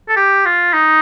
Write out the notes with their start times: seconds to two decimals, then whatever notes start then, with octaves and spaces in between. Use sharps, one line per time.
0.09 A4
0.17 G4
0.46 F4
0.73 D#4